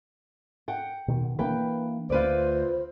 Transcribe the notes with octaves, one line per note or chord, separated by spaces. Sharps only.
F#5 G5
B2 D#3
E3 A#3 D4 B4 G5
D2 F4 B4 C5 D5